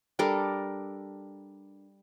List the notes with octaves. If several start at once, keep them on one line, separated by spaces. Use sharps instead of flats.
G3 D4 A4 A#4